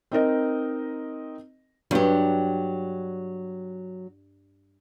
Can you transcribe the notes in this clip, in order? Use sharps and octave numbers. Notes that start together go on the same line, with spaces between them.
C4 D#4 A#4 D#5
G2 F#3 D4 G4